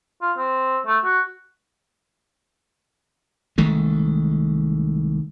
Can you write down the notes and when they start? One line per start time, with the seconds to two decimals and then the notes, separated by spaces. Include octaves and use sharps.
0.22 F4
0.37 C4
0.86 A3
1.05 F#4
3.58 C2 D#3 G#3 A3